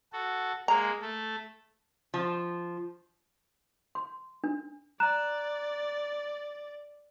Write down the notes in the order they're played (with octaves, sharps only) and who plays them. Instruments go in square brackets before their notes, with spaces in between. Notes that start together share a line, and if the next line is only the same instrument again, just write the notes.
[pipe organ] F#4 A4
[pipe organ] G#3 A#3 [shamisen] A#5
[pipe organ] A3 A4
[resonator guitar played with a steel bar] F3
[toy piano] C6
D4
[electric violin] D5 [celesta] A#5 F#6 E7